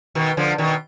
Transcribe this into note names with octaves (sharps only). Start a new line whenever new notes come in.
B2 D#3
D3 F3
B2 D#3